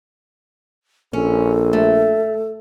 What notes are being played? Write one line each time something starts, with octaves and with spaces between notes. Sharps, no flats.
A#1 C#4 A4
A3